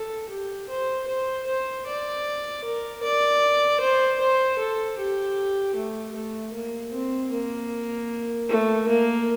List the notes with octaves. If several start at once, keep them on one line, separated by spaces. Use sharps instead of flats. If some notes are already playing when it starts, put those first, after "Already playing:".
Already playing: A4
G4
C5
C5
C5
D5
A#4
D5
C5
C5
A4
G4
A3
A3
A#3
C4
A#3
A3
A#3